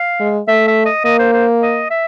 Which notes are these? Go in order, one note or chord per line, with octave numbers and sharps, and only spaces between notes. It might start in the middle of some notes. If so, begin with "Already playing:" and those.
Already playing: F5
G#3
A3 E5
E5
D#5
A#3 D#5
C5
C5
D#5
E5